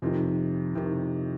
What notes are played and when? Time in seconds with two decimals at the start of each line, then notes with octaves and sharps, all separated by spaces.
0.02 F2 C3 D#3
0.75 C3 D#3